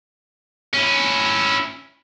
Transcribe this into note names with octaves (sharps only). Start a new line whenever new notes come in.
C#4 E4